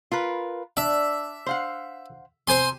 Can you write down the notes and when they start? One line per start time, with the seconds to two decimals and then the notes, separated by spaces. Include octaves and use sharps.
0.12 F4 A#4 B4
0.77 D4 E5
1.46 C5 F5 F#5
2.47 C3 C5 G#5 C6